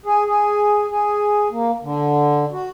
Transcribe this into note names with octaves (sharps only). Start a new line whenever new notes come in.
G#4
G#4
G#4
A#3
D3
F#4